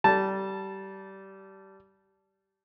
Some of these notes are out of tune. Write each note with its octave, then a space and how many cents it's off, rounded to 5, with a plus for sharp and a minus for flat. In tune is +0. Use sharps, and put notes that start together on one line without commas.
G3 -20 A5 +0